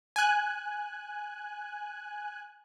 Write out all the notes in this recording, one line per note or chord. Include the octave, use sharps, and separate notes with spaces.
G#5 F#6